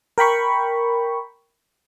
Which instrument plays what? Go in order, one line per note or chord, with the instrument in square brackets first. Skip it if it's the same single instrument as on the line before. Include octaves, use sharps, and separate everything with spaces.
[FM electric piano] A#4 G5 B5 C#6